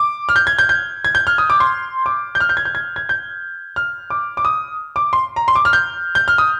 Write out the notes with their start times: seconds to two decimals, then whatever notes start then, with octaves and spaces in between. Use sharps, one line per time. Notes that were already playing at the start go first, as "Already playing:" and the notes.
Already playing: D6
0.29 F6
0.36 G6
0.47 G#6
0.59 G6
0.69 G6
1.05 G#6
1.15 G6
1.27 F6
1.38 D#6
1.50 D6
1.60 C6
2.06 D6
2.35 G6
2.40 F6
2.49 G6
2.57 G#6
2.65 G6
2.75 G#6
2.96 G#6
3.09 G6
3.76 F6
4.10 D6
4.37 D6
4.45 D#6
4.96 D6
5.13 C6
5.36 A#5
5.48 C6
5.55 D6
5.65 F6
5.73 G6
6.15 G6
6.28 F6
6.38 D#6